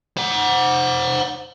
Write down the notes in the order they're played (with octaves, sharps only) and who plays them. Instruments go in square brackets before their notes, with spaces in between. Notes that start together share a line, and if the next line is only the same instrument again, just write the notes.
[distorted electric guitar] C5 F#5